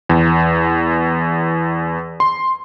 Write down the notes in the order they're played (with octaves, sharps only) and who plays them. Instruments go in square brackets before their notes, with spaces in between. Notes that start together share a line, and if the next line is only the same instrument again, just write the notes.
[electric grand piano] E2
C6